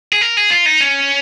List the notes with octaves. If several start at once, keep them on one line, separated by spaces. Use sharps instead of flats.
G#4
A#4
G#4
F4
D#4
C#4